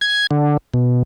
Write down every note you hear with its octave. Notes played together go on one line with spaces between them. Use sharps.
G#6
D3
B2